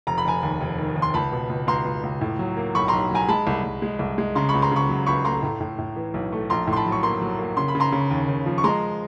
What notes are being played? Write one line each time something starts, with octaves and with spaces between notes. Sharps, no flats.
F1 A#5
B5
F1 G#5 A#5
D#2
F1
D#3
D#2
C6
C#2 A5 B5
B2
C#2
C#2 A#5 C6
C#2
C#2
A2
F#3
A#3
B1 B5 C#6
B1 A#5 C6
F#3 G#5 A#5
G#3 A5 B5
C2
C2
G#3
C2
G#3
C#3 A#5 C6
C#2 B5 C#6
A#5 C6
C#3 B5 C#6
F#3
C#2 B5 C#6
A3 A#5 C6
A2
A2
A2
E3
B1
A3
A#1 A#5 C6
A2
C6
A5 B5
F#3
C#6
A#3 A#5 C6
F#3
A#3
C#3 C6
B5
C#3
A#5 C6
C#3
D#2
D#2
F3
C#6
G#3 A#5 C6